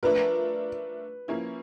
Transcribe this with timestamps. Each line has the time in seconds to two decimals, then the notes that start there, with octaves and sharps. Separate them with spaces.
0.03 F3 A3 D4 F4 A#4 B4
1.28 F3 A#3 C#4 E4